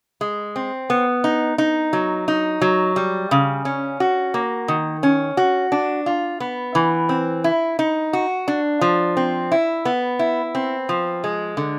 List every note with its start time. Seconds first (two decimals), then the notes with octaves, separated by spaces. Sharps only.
0.21 G#3
0.56 C4
0.90 B3
1.24 D#4
1.58 D#4
1.93 F#3
2.28 D#4
2.62 F#3
2.96 G3
3.31 C#3
3.65 C#4
4.00 F#4
4.34 A#3
4.68 D#3
5.03 C#4
5.37 F#4
5.72 D4
6.06 F4
6.40 B3
6.75 E3
7.09 C4
7.44 E4
7.79 D#4
8.13 F#4
8.48 D4
8.81 F3
9.17 C4
9.52 E4
9.85 B3
10.19 E4
10.55 C4
10.89 F3
11.24 G#3
11.57 D3